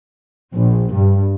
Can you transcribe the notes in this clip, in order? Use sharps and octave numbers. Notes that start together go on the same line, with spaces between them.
A#1
G2